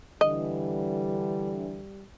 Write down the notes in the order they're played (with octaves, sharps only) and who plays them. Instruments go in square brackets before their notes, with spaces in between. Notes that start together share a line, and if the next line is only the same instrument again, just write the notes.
[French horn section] D3 E3 [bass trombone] G3 [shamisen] D#5